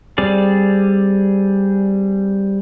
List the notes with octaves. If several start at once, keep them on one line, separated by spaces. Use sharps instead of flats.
G3 C4 G#4 D5